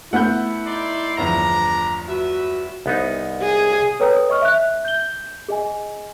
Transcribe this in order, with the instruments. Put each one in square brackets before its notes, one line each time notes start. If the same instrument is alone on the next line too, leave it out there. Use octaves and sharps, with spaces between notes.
[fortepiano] A3 B3 [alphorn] E4 [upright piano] F#5 G6
[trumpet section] D#4 D5 C6
[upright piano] G1 E2 F3 [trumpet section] D4 A#5
[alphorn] F#4 [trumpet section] B4 E5
[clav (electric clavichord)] C2 B3 D#4
[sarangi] G#4
[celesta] A4 B4 C#5 G5 A#5 D#6
C#5 D#5 C#6 F6
E5 F#6
G6 G7
G#4 D#5 G#5